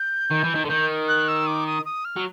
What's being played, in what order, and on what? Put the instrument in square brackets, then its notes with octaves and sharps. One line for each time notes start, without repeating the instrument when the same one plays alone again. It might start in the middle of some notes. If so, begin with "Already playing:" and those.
Already playing: [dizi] G6
[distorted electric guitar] D#3
E3
D#3
D3
[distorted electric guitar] D#3 [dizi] G6
[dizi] F#6
E6
D6
D#6
D#6
F6
[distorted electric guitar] F#3